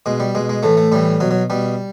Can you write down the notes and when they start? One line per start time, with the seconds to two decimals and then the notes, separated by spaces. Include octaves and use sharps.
0.06 B2 G#3
0.20 G3
0.35 B2 G#3
0.49 G#3
0.63 A2 E3 A3
0.77 A3
0.92 A2 E3 G3
1.20 B2 F#3
1.31 F#3
1.50 B2 G3